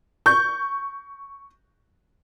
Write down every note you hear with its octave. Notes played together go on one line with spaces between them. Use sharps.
C#6 G6